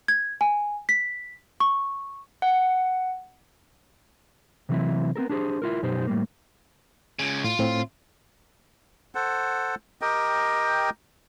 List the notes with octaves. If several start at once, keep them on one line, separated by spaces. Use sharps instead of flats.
G#6
G#5
B6
C#6
F#5
C3 E3 F#3 C4 E4
B3 C4 A4 A#4
D4 G4 G#4 B4 C5
E4 F4 A#4
F#2 B2 D#4 G4 C5
A2 G3 A#3
C#2 C#3
A2 F4
A2 C4
A4 C5 F#5
G4 A#4 D#5 G5